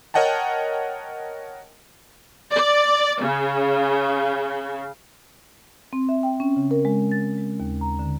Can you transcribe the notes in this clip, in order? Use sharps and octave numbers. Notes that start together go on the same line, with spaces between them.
A#4 C#5 D#5 F#5 G5 A5
D5
C#3
C4
E5
G5
C#4
C#3
A#4
G#3
A6
G#3
D#2
A#5
D3